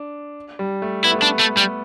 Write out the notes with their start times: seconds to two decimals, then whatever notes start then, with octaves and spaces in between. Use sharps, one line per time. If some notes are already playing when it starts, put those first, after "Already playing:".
Already playing: D4
0.59 G3
0.82 A3
1.04 B3 E4
1.11 A3
1.19 B3 D4
1.39 A3
1.57 G3